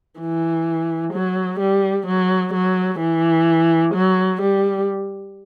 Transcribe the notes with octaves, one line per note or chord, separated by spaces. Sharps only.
E3
F#3
G3
F#3
F#3
E3
F#3
G3